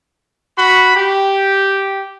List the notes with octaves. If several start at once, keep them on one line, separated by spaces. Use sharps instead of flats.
F#4 B5
G4